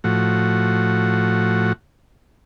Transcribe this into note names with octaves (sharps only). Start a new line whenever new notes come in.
A2 F3 F#4